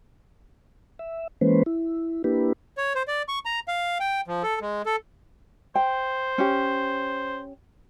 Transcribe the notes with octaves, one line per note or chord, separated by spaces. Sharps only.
E5
E3 G#3 A#3 C#4 B4 C5
E4
A#3 D4 E4 G4 B4
C#5
C5
D5
C#6
A#5
F5
G5
F3
A4
G#3
A4
C5 G5
C#4 G4